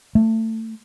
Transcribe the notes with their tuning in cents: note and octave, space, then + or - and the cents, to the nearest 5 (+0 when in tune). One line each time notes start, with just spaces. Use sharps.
A3 +25